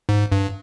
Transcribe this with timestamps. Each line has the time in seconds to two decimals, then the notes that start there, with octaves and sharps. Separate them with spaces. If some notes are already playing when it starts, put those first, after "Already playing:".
0.09 G#2
0.32 G2